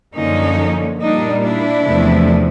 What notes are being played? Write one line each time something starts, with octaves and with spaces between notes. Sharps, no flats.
F#2 D3 F3 A#3 C#4 D#4
A#2 G3 A#3 D4 D#4
D4 E4
E2 C3 F3 A3